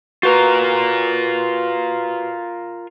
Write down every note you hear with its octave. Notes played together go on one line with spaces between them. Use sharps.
F4 F#4 A#4 B4 A#5